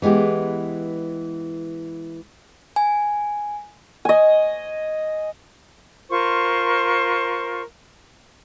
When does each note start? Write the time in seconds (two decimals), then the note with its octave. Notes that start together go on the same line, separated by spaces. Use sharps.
0.02 E3 G#3 B3 G4
2.76 G#5
4.05 D#5 G#5
6.09 F4 A#4 C5 C#6